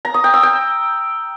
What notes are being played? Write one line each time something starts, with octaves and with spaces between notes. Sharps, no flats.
A#5
D#6
G5
E6
G5